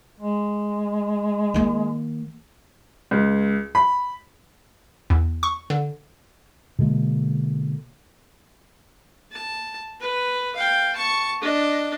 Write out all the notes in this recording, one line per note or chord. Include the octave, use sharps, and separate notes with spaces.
G#3
D#3 A#3
C#2
B5
E2
C#6
D3
B2 D3 G#3 A#3
A5
B4
F5 G5
A5 C#6
D4 D#5